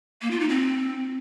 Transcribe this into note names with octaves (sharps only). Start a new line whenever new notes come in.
A#3
F4
D#4
C4